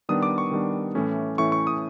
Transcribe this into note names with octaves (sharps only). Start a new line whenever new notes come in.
D#3 G3 B3 D4 D#6
D6
C#6
D#3 G3 B3 D4
A2 E3 A3 C#4
A2 E3 A3 C#4 C#6
C#6
D#6